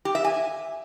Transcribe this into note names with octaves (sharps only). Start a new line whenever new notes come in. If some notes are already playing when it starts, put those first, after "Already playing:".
G4
E5
G#5